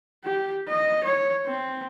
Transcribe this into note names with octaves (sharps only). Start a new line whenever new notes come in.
G4
D#5
C#5
C4